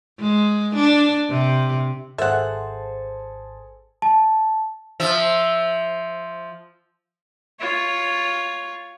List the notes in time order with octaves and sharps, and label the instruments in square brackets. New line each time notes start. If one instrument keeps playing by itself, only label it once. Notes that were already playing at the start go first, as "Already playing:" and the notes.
[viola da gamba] G#3
D4
C3
[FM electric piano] G#1 C5 A5 [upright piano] G#4 A4 [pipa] E5 F#5
[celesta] A5
[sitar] F3 E5
[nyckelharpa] F4 C#5